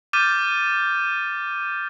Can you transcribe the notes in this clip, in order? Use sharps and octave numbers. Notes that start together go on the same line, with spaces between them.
D6 F6 G6 A6 D#7